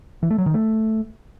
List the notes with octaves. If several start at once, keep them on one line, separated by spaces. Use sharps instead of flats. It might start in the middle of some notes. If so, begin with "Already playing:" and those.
E3
A3
F#3
D#3
A3